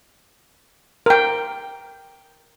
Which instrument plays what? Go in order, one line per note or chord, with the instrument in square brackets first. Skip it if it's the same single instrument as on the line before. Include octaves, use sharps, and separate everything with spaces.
[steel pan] A#4 G5